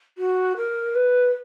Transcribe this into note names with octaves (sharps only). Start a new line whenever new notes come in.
F#4
A#4
B4